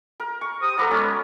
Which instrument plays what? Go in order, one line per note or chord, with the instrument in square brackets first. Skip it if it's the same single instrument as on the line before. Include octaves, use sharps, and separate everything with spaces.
[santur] A#4
C#6
[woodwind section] G4 C5 D#6
[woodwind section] F3 F#5 A#5 [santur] A4 B4 D5
[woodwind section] F#3 G#3 B3 [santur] C#4 A#4